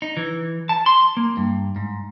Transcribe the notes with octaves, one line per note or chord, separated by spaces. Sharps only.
D#4
E3
A5
C6
A#3
G2
G#2